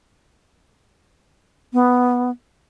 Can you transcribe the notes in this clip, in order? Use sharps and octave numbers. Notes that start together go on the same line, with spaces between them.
B3